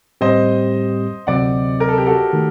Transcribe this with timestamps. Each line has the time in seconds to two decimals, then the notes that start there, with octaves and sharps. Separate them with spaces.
0.21 A2 G3 C4 G4 C5 D#5
1.27 D2 C3 F#3 C4 D5 F#5
1.80 A#4
1.89 A4
1.98 G4
2.06 F#4 A4
2.33 D#3 A3